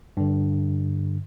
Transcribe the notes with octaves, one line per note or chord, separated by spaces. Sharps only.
G2 D3